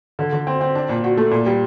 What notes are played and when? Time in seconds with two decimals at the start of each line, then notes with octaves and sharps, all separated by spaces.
0.19 D3
0.33 D3
0.47 C4
0.61 C4
0.75 D4
0.89 A#2
1.04 F#4
1.17 A3
1.31 A#2
1.46 G3